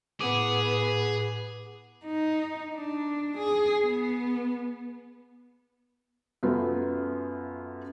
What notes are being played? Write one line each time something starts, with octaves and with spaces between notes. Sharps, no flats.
A2 B3 G#4 D6
D#4
D4
G#4
B3
F#2 A3 B3 F4 B4